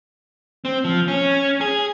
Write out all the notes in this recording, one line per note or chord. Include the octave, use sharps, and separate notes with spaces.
C4
F3
C#4
G#4